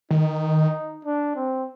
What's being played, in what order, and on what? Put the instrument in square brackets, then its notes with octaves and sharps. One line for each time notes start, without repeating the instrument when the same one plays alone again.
[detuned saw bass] D#3 [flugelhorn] D#4
[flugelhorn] D4
C4